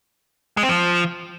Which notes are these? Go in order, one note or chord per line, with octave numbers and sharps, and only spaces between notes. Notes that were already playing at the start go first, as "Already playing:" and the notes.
G#3
C4
F3